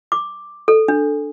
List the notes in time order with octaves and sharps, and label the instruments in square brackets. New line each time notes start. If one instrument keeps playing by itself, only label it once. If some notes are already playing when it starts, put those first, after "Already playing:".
[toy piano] D6
A4
D4